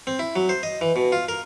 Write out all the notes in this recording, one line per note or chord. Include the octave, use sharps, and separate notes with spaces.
C4
E4
F#3
C5
D#5
E3
B2
F4
A#4